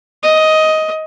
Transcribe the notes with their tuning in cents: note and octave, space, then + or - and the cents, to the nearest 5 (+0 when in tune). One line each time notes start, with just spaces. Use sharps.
D#5 +10